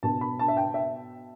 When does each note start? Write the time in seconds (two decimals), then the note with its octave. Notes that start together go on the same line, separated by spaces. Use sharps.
0.03 B2 B3 A5
0.21 B5
0.39 A5
0.48 E5
0.57 G5
0.74 E5